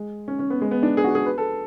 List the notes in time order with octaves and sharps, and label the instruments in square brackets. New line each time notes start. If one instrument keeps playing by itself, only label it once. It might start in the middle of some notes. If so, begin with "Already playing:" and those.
Already playing: [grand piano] G#3
C#4
C#4
B3
G#3
B3
D4
G#4
F#4
G#4
B4
A4